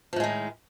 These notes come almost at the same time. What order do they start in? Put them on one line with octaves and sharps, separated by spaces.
F3 A2 G#3 D#3